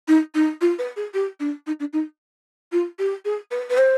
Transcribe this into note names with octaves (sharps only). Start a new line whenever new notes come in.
D#4
D#4
F4
B4
G#4
G4
D4
D#4
D4
D#4
F4
G4
G#4
B4
B4
C5